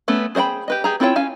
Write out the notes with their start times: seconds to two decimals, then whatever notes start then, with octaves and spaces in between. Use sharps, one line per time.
0.08 A3 B3 C#4
0.35 G#4 C5 D#5 G5 B5
0.68 G4 B4 D#5
0.84 G4 G#4 A#5
1.00 C4 E4 F4 C#5 G5
1.16 C#4 F5 G#5